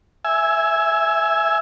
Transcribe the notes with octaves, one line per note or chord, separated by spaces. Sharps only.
E5 G#5